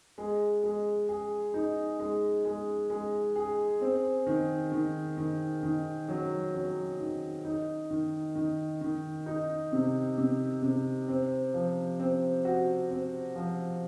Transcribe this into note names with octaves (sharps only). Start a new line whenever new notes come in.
G#3
G#3
G#4
D#4
G#3
G#3
G#3
G#4
C4
D#3
D#3
D#3
D#3
F#3
F#3
D#3
D#4
D#3
D#3
D#3
D#4
C3
C3
C3
C4
F3
C4
F#4
C4
F3